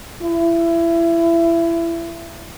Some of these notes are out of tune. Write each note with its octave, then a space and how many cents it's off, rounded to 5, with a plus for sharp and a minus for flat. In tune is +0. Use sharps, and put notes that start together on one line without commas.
E4 +25